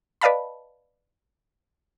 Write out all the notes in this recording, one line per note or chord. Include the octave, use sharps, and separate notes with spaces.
B4 D5 D#5 F5 A5 B5